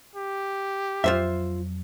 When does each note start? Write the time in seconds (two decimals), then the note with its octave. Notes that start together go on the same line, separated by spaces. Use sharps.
0.15 G4
1.04 F2 F#3 F4 C5 E5